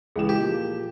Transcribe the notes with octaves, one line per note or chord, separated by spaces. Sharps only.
C#2 E3 G#4 E7
G4
A#2 F3